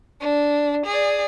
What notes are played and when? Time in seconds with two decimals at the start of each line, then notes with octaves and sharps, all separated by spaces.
0.21 D4
0.86 G#4 D5